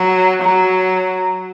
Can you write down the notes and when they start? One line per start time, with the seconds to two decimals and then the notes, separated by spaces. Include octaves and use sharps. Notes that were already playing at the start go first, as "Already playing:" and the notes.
Already playing: F#3
0.42 F#3